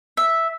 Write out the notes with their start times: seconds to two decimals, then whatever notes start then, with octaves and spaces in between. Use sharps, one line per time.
0.17 E5